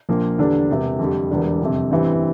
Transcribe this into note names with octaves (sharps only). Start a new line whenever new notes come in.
A#1 A#2 F3 A#3
E2 D3 G3 D4 A4
E1 E2 C3
F2 D3 G3
E1 E2 D3 G3 D4
G1 F2 C3
A1 G2 E3 G3 C4